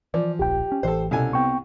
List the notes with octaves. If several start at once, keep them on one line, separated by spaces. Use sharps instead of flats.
E3 F3 D5
D1 A#1 G4 G5
C#4
A1 E3 A4 C5
C2 B2 C#4 A4 G#5
B3 C4 G5 C#6